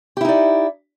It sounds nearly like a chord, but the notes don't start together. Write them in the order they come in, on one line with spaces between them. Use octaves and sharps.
G4 E4 D#4 D5